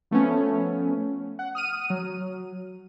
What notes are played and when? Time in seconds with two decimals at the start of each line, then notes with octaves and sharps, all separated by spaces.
0.11 F3 A3 B3 C#4
1.39 F#5
1.55 D#6 F6 D#7
1.90 F#3